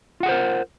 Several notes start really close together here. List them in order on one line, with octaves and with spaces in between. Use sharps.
F4 F#5 G#4 C5 A#4